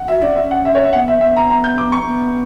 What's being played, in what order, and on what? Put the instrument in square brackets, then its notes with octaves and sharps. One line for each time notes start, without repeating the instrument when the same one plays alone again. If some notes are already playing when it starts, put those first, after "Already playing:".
Already playing: [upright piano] F#5
[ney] F#4 [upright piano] E5
[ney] C#4 [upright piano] D5
[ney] C#4 [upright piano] E5
[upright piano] F#5
E5
C#5
E5
[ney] B3 [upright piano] F#5
[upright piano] E5
[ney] B3 [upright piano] E5
[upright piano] A#5
A#5
G6
D6
C#6
[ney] B3